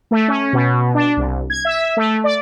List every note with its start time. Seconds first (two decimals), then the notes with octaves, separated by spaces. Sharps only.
0.11 A3
0.28 C#4
0.53 B2
0.94 D4
1.17 C2
1.50 G#6
1.65 E5
1.97 A3
2.24 D5